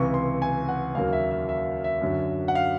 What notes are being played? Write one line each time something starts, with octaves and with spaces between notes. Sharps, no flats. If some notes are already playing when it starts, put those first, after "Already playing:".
Already playing: C#2 C3 E3 C#6
C6
G#5
F#5
D#2 C#3 F#3 A#3 F5
E5
E5
E5
E5
F#2 D3 F#3
F#5
F5